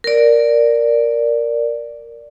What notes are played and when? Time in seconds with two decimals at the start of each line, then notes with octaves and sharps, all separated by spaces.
0.04 A#4 D5